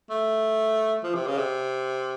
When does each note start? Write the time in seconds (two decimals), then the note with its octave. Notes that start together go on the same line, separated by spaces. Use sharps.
0.10 A3
1.03 F3
1.15 C3
1.27 C#3
1.38 C3